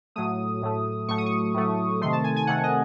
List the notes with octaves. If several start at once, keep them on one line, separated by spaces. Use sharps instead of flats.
A2 F#3 A3 D#6
A2 F#3 A3
A2 F#3 A3 C#6
D#6
C#6
A2 F#3 A3
C3 D#3 A3 C6
A5
G#5
G#5
C3 D#3 A3 F#5
D#5